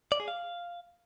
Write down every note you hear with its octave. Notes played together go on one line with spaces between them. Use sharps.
D5
G#4
F5